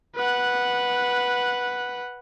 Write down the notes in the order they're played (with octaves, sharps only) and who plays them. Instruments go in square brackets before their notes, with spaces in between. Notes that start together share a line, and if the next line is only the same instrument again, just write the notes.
[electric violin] B4 F#5